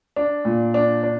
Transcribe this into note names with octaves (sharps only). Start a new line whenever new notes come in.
D4
A#2
D4
D4